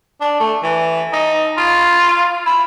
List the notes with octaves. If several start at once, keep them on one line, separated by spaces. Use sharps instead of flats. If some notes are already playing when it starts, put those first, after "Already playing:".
D4
A3
E3
D#4
F4
E4